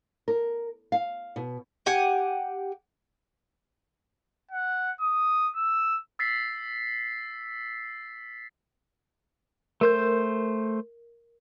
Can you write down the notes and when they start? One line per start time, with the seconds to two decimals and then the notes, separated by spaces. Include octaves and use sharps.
0.28 A#4
0.92 F5
1.36 B2
1.86 G4 F#5 G#5
4.51 F#5
5.00 D#6
5.55 E6
6.19 E6 A6 B6 C7
9.81 A3 A#4 C5 G6